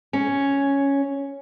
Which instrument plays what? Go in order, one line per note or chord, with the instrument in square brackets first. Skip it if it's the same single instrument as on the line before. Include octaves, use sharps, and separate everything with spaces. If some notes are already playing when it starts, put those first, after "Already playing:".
[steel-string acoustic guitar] C#4